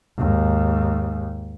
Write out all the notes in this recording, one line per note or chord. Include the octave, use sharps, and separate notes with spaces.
D#2 G#2